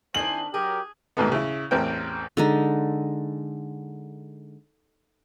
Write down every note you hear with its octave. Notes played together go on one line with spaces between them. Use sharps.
D#3 C4 D4 E4 C5 G#5 F#7
F#3 G4 G#4 A#4
A1 D#2 G#2 B2 A3 B3
C#3 E4
A1 E2 C4 A#4 G5
D3 G#3 D#4